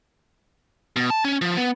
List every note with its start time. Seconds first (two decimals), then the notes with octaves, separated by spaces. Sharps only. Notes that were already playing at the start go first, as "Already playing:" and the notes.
0.96 B2
1.10 A5
1.25 C#4
1.42 F3
1.57 B3